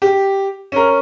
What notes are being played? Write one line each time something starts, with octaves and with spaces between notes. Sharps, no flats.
G4
C#4 A#4